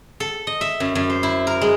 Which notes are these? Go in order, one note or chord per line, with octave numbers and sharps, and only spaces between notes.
A4
D#5
E5
F#2
F#2
C5
E4
A#4
G#3